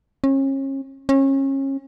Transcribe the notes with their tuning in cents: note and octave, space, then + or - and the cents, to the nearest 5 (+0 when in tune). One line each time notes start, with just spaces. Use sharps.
C#4 -35
C#4 -30